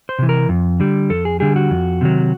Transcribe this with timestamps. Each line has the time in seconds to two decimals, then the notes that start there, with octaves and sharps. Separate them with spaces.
0.09 C5
0.19 C3 E3
0.29 A#4
0.49 F2
0.80 D3 G3
1.10 F2 A4
1.25 G#4
1.40 D3 G3 G#4
1.56 F#4
1.70 F2
2.01 C3 D#3 F#3